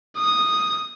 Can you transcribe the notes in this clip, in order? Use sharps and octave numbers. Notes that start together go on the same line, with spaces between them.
D#6